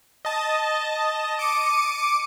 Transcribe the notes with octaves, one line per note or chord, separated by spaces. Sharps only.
D#5 A5
D6 C#7 D#7